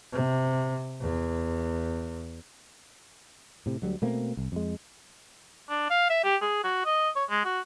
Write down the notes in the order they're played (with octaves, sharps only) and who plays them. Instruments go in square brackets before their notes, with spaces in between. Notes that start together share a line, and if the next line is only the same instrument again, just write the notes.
[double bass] C3
E2
[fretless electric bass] A2 C3
D2 F#3 G3
B2 A3 A#3 C4
C2
F2 G#3
[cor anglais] D4
F5
E5
G4
G#4
F#4
D#5
C#5
G#3
F#4